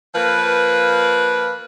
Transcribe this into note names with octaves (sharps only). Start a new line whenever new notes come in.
F3 A#3 B4